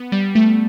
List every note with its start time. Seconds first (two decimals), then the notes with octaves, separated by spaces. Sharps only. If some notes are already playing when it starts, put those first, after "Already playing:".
Already playing: B3
0.12 G3
0.35 A3